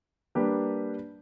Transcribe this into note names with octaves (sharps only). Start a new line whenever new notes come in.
G3 A#3 D4 G4 B4